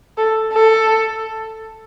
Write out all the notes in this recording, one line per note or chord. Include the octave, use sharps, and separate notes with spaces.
A4
A4